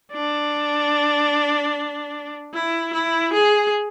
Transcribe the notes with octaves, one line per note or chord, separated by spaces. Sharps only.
D4
E4
E4
G#4